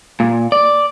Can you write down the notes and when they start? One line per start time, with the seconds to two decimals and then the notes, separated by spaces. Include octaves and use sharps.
0.20 A#2
0.52 D5